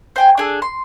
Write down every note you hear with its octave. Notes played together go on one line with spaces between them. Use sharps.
C5 G5 G#5
D4 G#4 A4
C6